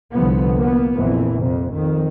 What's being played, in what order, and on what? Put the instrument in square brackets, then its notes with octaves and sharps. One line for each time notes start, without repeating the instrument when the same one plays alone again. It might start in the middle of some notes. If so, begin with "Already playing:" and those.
[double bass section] C2 D3 F3 B3
A#3 B3
A#1 F2 E3
F2 C3
F2 D#3